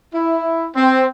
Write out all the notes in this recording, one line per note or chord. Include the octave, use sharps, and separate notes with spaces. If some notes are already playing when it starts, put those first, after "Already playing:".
E4
C4